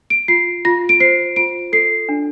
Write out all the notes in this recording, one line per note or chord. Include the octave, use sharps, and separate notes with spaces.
D7
F4 C7
F4 A#6
D7
C5 C7
F4 D7
A4 C7
D4